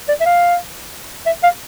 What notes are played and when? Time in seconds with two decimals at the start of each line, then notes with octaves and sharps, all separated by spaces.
0.08 D5
0.21 E5
0.26 F5
1.26 E5
1.43 F5